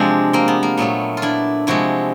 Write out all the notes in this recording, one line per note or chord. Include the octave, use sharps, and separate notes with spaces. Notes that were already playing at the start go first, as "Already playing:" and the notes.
Already playing: C3 F3 G#3 C4 D4
A#3 C4
B3
A#3
A#2 F#3 A3 B3
F4
D4 E4
C3 F3 G#3 E4 F#4